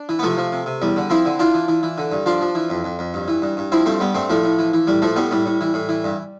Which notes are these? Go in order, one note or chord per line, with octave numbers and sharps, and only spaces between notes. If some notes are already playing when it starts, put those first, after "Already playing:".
Already playing: D4
E3
B3
C3 F3 A3
F3
C3
C3
E2 G3
D3
F3 C4 E4
D3
E3 D4 F4
E3
E3
E3
D3
G2
F3 D4 F4
F3
E3
F2
F2
F2
G2
E3
G2
G2
F3 C4 E4
G2 A3 C4
G2 G3 B3
G2 A3 C4
A2 F3 A3
A2
E3
E3
A2 G3
A2 F3 A3
A2 G3 B3
A2 G3
A2
E3
A2
E3
G2